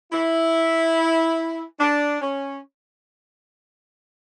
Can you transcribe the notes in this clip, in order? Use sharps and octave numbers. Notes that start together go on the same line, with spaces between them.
E4
D4
C#4